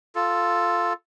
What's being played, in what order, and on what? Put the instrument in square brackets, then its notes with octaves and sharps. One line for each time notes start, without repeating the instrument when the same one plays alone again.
[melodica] F4 A4